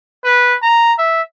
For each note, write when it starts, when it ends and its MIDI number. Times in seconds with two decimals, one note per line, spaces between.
0.24 0.56 71
0.62 0.93 82
0.98 1.22 76